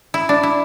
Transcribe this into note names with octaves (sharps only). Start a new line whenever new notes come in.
E4
D4
E4